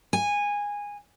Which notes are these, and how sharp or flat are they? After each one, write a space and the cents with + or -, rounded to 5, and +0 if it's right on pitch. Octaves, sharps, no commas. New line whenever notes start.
G#5 -15